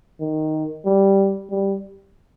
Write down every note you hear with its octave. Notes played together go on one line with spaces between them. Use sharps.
D#3
G3
G3